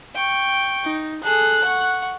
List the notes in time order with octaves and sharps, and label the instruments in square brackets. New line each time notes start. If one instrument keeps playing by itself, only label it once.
[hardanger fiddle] G5 C#6
[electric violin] D#4
[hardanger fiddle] G#4 A4 [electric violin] F#6
[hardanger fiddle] F#5 C#6